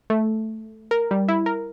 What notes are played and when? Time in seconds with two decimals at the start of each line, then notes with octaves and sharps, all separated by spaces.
0.10 A3
0.91 A#4
1.11 G3
1.28 E4
1.46 A#4